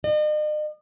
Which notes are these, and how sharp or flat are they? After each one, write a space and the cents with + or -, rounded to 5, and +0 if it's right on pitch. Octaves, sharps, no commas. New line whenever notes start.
D#5 -45